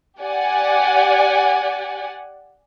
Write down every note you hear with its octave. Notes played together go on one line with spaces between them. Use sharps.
G4 D5 F#5 G#5